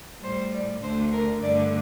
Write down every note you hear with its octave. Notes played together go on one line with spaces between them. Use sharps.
A2 G3 C5
D5
D2 D3 A3 C5
A#4
G2 D3 A3 D5